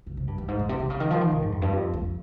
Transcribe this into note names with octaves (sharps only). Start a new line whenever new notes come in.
C#3
C3
G2
G2
G#2
A#2
C3
C3
C#3
D#3
F3
D#3
C3
G#2
F2
G2
F2
F2